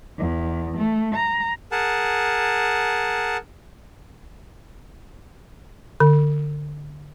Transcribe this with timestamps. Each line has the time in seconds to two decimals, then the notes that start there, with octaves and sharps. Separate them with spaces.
0.18 E2
0.76 A3
1.14 A#5
1.72 G#4 A#4 F#5 A5
6.00 D3